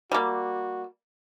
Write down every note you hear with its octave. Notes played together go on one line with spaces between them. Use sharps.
G3 A#3 F#4